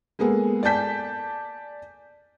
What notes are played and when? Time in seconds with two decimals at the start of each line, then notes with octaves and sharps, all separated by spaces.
0.19 G#3 A#3 B3 G#4 A4
0.63 D5 G#5 A5 G6 B6